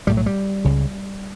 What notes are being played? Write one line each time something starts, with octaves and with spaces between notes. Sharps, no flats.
B1 A2 G3
F#3
G3
C#2 C#3